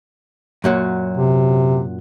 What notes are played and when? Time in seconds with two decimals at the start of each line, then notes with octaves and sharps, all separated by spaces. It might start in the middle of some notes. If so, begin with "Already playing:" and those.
0.64 F#2 A#2 F#3
1.17 C3